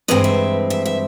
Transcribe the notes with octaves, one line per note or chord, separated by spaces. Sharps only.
G2 E3 G#3 C4 D#5
E5
E5
E5